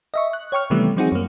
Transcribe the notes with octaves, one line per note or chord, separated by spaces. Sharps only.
D#5 E5 C#6
F#6
C#5 G5 C#6 F6
C3 D#3 E3 G3 A3 B3
F3 G3 C4 D#4 F#4 G#4
F#2 A#3